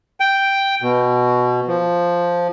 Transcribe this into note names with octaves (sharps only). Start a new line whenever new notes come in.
G5
B2
F3